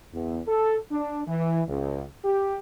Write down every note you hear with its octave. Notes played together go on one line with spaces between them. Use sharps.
E2
A4
D4
E3
C#2
G4